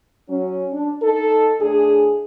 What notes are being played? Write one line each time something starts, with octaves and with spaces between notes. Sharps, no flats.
F#3 C#4
D4
D#4 A4
A2 D4 G#4